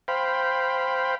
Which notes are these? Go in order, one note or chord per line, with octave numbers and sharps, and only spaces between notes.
C5 F5 G5 B5